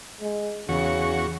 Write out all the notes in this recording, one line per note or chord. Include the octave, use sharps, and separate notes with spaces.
G#3
E2 C#3 F#4 C#6